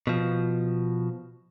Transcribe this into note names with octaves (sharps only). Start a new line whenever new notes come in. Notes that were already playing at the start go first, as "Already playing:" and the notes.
B2 F3